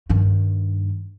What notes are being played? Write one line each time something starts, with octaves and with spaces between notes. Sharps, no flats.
G2 D#3